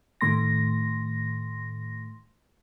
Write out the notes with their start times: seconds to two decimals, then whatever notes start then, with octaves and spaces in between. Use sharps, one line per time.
0.21 A2 D#3 A3 C6 A#6